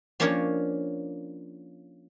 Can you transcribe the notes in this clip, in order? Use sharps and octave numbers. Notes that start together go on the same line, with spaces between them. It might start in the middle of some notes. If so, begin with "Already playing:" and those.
F3 A#3 C#4 D4 A#4 C#5